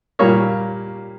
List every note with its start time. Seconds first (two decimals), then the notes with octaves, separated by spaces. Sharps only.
0.19 A#2 G3 A#3 C#5